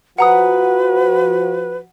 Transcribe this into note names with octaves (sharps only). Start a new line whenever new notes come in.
F3 F#4 B4 F#5 A#5 D#6